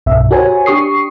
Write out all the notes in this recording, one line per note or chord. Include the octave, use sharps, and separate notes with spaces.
C2 G2 B2 E5
F#4 G4 A#4 C5 C#5 G#5
D4 G4 C#6 D#6 C7